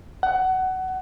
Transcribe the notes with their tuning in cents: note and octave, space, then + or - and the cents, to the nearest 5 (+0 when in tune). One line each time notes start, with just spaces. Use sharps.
F#5 +20